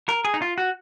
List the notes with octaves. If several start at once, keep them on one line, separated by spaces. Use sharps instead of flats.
A#4
G#4
D#4
F4
F#4